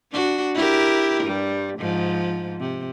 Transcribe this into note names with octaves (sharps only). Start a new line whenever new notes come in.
D4 F#4
E4 G4 A#4
G2 G3
G#2 F3
C3